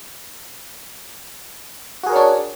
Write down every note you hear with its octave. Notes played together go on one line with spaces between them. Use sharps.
D4 F#4 G#4 A#4 C#5